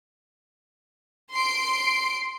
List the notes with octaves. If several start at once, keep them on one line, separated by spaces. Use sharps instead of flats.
C6 C7 D7